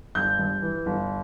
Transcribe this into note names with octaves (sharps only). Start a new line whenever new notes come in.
G1 G6
G2
E3
G1